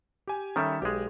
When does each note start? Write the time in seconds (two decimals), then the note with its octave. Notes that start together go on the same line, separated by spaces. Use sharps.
0.27 G4 G#5
0.56 D#3 G3 C#4 A4 E5
0.82 B1 G#3 G4 G#4